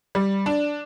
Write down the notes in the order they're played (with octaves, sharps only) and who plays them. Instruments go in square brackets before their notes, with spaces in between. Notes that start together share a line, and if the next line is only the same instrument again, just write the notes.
[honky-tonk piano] G3
D4